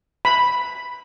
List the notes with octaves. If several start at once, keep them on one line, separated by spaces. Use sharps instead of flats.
B5